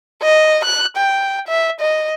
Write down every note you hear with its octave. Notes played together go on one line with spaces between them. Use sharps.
D#5
F#6
G5
E5
D#5